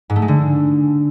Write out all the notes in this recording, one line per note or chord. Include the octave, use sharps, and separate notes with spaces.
G#2
A3
G#3
D3